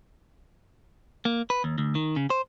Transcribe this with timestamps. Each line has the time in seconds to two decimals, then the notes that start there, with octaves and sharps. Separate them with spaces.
1.25 A#3
1.50 B4
1.64 D#2
1.78 D2
1.95 D#3
2.16 C#3
2.30 C5